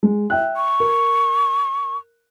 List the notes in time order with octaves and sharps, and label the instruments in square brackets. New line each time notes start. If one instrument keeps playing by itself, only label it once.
[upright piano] G#3
E5 G5 F#6
[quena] C#6
[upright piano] A#4